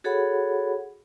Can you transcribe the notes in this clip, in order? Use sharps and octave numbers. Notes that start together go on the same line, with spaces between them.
F#4 G#4 A4 C#5 F#5 B5